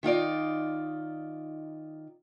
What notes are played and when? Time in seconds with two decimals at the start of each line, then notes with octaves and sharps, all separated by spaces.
0.03 D#3 D#4 F4 D5